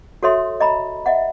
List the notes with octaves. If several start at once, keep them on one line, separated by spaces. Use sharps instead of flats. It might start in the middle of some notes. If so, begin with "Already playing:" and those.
F#4 A4 C#5 E5 C6
D#5 A#5 B5
D#5 E5 F#5